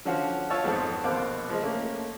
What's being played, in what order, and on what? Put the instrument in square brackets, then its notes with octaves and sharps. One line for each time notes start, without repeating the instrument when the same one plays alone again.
[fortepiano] D3 F3 C#4 F#4 F5
F4 C#5 A5 E6
F2 G#2 B3 C4 A4 A5
A#1 B2 C4 F5 D6 F#6
F3 G#3
A3 A#3 C#4